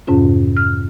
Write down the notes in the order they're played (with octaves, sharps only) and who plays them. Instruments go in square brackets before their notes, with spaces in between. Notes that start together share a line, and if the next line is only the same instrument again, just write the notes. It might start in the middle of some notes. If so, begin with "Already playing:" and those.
[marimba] F2 G#2 C3 C#4 F4
F6